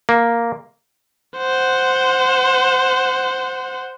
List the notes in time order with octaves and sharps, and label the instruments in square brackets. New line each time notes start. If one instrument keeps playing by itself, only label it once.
[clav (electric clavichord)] A#3
[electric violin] C5 F#5